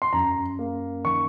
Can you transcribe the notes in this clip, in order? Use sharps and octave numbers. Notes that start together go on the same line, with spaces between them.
C6
F#2 A#5
A#3
D#3 C#6